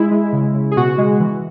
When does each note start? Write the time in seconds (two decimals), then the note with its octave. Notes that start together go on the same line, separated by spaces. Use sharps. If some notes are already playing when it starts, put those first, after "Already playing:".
Already playing: G#3 E4
0.11 G#3
0.33 C#3
0.55 C#3
0.71 G#4
0.76 B2 F#4
0.98 G#3
1.20 E3